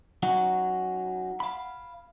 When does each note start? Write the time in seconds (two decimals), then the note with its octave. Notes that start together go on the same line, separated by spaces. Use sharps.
0.23 F#3 C#4 D#4 F#5
1.40 F5 B5